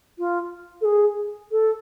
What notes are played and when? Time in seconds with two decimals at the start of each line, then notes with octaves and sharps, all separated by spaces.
0.19 F4
0.81 A4
0.85 G#4
1.51 A4